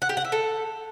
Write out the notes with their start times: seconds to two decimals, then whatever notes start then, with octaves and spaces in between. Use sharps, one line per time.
0.02 F#5
0.09 G4
0.17 F#5
0.25 E5
0.32 A4